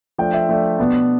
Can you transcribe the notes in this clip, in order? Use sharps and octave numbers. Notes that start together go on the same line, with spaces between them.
F3 A3 D4 G5
E5
F3 A3 D4
B2 B3 D4